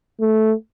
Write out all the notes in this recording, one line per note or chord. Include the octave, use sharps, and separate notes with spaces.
A3